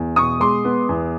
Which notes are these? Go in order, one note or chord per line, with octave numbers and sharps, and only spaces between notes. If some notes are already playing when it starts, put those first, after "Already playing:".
Already playing: E2
B2 C#6 D#6
G#3 C6 D6
B3
E2